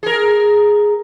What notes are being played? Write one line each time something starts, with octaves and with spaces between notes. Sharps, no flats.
G#4 A#4